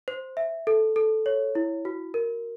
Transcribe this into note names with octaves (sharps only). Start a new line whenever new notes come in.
C5
E5
A4
A4
C#5
E4
F#4
A#4